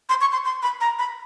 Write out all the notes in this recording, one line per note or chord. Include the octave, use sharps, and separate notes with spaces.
C6
C#6
C6
C6
B5
A#5
B5